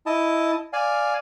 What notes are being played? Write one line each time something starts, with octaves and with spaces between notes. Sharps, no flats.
E4 D#5 A5
D5 F5 G#5